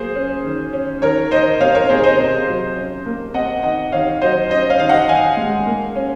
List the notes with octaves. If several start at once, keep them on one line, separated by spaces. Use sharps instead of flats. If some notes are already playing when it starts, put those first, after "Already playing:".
Already playing: F#3 A#3 G#4 C5
C#4
D#3
C#4
D#3 A#4 C#5
D#3 C5 D#5
C3 C#5 F5
A#4 C#5
C3 G#4 C5
C5 D#5
C3
F#3
C#4
A#3
C4 D#5 F#5
D#3 D#5 F#5
D#3 C#5 F5
F#3 C5 D#5
C#4 C5 D#5
C#5 F5
D#3 F5
D#5 F#5
D#3 F5 G#5
G#3
A#3
C#4